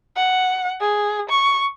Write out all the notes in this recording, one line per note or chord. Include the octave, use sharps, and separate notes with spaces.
F#5
G#4
C#6